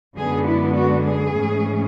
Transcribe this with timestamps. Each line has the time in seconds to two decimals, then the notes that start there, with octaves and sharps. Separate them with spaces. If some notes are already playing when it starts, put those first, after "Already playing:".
0.18 F#2 D3 G#3 B3 D4 G#4
0.47 E4
0.76 F#4
1.06 G#4
1.35 G#2 E3 A3 C#4